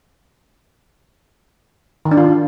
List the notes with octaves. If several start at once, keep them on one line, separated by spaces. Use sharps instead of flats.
D#3
D4
F4